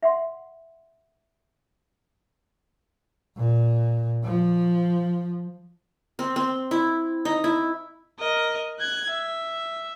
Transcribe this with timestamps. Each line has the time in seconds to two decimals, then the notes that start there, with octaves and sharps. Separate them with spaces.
0.03 E5 F#5 C6
3.38 A#2
4.24 F3
6.19 C4
6.36 C4
6.71 E4
7.25 D#4
7.44 E4
8.19 A#4 D#5
8.79 F#6 G#6
9.10 E5